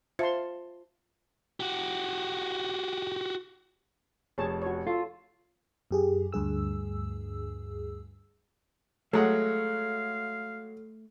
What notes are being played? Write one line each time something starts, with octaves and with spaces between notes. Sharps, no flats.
F4 C5 E5 A5 C6
F#4 G4
F1 G#4 C#5 A5
F#4 C#5
F4 A4
F#2 G4 G#4
D2 G2 G#4 E6
F#3 G#3 A3 A4 F5 F#5